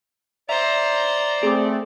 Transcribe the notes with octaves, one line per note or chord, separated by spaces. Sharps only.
C5 D5 E5 A#5
A3 C4 G#4 D6